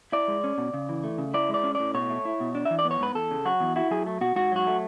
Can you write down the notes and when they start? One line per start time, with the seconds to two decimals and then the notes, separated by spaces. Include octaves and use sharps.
0.12 E4 D5
0.28 G#3
0.44 C#4
0.58 B2
0.74 C#3
0.89 E3
1.04 A3
1.18 C#3
1.34 E4 D5
1.49 G#3 D5
1.64 C#4
1.75 A2 D5
1.94 B2 C#5
2.10 A3
2.25 E4
2.40 B2
2.55 D4
2.65 E5
2.70 E3
2.79 D5
2.85 B3
2.91 C#5
3.00 G#2 B4
3.15 E2 A4
3.31 C#3
3.45 F#3 F#4
3.60 E2
3.76 E4 F#4
3.91 F#3 G#4
4.06 A3
4.21 B2 F#4
4.36 G#2 F#4
4.52 F#3 F#4
4.67 A3